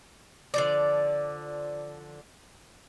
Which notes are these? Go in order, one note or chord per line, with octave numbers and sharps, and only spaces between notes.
D3 F3 D5